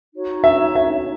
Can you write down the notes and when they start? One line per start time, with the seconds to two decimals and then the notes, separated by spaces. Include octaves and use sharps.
0.13 D#4 F#4 C#5
0.44 E5
0.75 E5